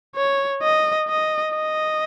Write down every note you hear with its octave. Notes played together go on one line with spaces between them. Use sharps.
C#5
D#5
D#5
D#5